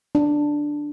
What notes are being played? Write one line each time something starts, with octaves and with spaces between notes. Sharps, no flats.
D4